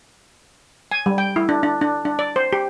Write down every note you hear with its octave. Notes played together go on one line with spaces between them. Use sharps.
G#5
G3
G5
E4
D4
D4
D4
D4
D5
C5
G4